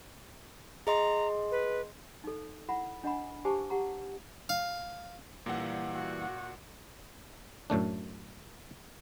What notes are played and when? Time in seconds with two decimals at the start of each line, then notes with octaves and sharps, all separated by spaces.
0.87 G#4 D#5 A#5 C6
1.51 B4
2.24 D#4 A4
2.69 E4 F#5 B5
3.04 D4 D#5 F#5 G#5 B5
3.45 G4 C5 G#5 A5 C#6 D6
3.70 G4 F#5 A#5
4.49 F5
5.46 A#2 E3 G3 A#3 F#5
5.93 F#4
7.70 F#2 A2 A3 D4